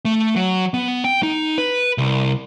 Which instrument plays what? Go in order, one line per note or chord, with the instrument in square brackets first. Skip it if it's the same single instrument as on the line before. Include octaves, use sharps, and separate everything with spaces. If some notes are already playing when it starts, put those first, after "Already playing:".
[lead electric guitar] A3
F#3
B3
G5
D#4
B4
C2